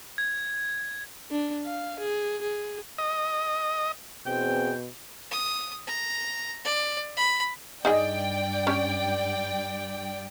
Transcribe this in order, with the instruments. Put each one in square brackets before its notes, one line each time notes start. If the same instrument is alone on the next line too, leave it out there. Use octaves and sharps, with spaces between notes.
[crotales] G#6
[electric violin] D4
F5
G#4
G#4
[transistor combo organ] D#5
[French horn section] E2 C4 G#4 [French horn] B2 [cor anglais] G5
[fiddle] D#6
A#5
D5
B5
[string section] G2 D5 G5 [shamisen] D#4 G#4 D#5
[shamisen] C#4 G4